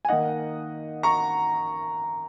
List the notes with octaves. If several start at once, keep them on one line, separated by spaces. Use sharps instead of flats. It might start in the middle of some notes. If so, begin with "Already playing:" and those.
G#5
D#3 A#3 D#4 D#5 F#5
A#5 C#6